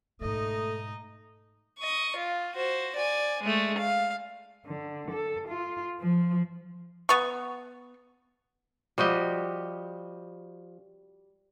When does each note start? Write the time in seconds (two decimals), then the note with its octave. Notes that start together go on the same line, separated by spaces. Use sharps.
0.21 G#2 B2 A3 D#4 D#5
1.78 D#5 C#6
2.16 F4
2.56 F#4 C5
2.96 D5 G#5
3.43 G#3 A3
3.78 F5
4.66 D3
5.11 A4
5.48 F4
6.00 F3
7.09 B3 C#6
8.98 F3 G3 F#4 G4 D#5